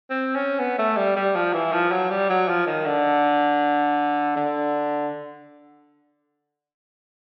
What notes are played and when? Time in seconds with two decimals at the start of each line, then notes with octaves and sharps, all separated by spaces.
0.10 C4
0.35 C#4
0.59 B3
0.79 A3
0.97 G3
1.16 G3
1.35 F3
1.53 E3
1.73 F3
1.92 F#3
2.10 G3
2.30 F#3
2.48 F3
2.66 D#3
2.86 D3
4.37 D3